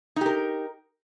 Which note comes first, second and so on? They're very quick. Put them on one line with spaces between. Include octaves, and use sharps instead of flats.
D#4 G4 A#4